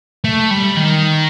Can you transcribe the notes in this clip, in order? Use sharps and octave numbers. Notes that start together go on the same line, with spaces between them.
A3
G3
D#3